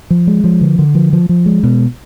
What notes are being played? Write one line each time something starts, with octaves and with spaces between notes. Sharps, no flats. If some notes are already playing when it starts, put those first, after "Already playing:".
F3
G#3
F3
D3
D3
F3
F3
F3
G#3
B2